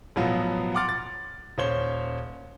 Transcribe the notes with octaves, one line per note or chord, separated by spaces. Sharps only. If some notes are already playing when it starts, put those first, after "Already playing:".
A1 B2 F3 F#3 B3 F5
F#5 C6 D6 F6 A6
A6
D#1 C#4 C5 C#5 G7